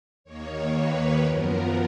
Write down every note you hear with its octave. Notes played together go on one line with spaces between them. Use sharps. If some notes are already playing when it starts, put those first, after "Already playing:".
D#2 D#3 A#3 C#5
B4
F#2 F3 B3 A#4